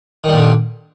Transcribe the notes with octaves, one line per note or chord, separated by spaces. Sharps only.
A#2 D3 D#3 G3